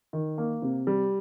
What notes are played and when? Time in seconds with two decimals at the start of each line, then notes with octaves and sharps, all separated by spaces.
0.13 D#3
0.38 A#3
0.62 C3
0.87 G3